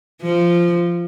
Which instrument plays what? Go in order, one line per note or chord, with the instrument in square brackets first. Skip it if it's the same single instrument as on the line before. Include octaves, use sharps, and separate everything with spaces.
[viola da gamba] F3